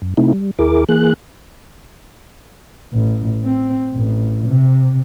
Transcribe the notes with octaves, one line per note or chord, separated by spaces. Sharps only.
F#2
C3 A3 C4 D#4 E4
G3
D#2 E4 G#4 A#4 D6
E3 A#3 G#4 F#6
A1
C4
A1
C3